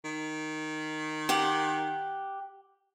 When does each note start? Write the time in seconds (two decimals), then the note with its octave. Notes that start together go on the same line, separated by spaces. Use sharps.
0.04 D#3
1.29 G4 F#5